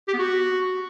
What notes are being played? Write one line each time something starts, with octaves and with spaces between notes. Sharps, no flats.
G4
B3
F#4